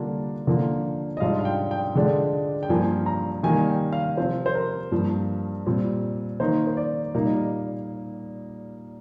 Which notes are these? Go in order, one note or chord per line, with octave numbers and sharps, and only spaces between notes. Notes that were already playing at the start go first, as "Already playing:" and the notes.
Already playing: D3 G3 A#3 D4 F4
D3 F3 A#3 F4
D#5
G#2 G3 D4 F4 F5
F5
G5
G5
D3 G#3 D4 F4
G5
G2 F3 A#3 F4 G#5
A#5
D#3 G3 A#3 G#5
G5
F5
C3 F3 C4 F4 C5
C5
A#4
G2 F3 A#3
A#2 G3 C4
D#3 A#3 D#4 C5
C5
D5
A#2 G3 A#3 D#4 F5
D#5